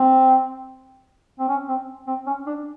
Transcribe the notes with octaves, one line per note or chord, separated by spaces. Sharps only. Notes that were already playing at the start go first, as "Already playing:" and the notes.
Already playing: C4
C4
C#4
C4
C4
C#4
D4